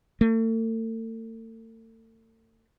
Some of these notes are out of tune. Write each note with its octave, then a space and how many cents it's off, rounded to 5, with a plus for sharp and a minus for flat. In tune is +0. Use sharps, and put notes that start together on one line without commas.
A3 +40